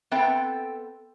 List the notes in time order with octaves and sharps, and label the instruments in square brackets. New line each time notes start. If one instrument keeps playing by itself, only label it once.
[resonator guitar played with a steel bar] B3 C4 A4 E5 G5